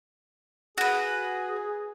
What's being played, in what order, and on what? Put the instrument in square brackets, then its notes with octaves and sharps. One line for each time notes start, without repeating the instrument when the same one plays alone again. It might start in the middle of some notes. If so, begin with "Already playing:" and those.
[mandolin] F#4 B4 [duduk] G#4